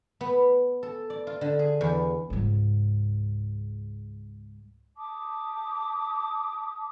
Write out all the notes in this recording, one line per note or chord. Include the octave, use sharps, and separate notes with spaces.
B3
A4
D5
F4
D3
G#4
E2
C#2 G#2
A5 D6 D#6